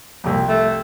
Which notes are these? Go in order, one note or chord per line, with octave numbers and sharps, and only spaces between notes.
C2 F2
A3